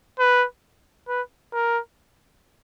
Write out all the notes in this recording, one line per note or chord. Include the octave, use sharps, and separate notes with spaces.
B4
B4
A#4